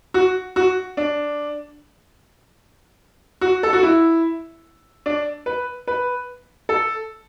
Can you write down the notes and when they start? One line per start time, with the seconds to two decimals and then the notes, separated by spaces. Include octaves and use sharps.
0.14 F#4
0.56 F#4
0.97 D4
3.41 F#4
3.63 A4
3.73 F#4
3.83 E4
5.06 D4
5.46 B4
5.87 B4
6.69 A4